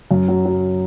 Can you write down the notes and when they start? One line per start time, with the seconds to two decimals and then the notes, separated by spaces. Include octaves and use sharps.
0.11 F#2
0.28 F#3
0.45 F#3